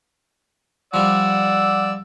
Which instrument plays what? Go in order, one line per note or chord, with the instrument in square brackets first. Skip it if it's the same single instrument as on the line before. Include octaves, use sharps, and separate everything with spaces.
[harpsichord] F3 G3 [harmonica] D5 F#5 E6